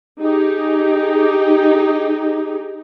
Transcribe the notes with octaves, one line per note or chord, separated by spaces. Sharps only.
D#4 G4 G#4